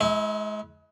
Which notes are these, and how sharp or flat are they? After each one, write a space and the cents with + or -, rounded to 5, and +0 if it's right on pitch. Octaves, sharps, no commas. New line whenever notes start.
G#3 +35 E4 -20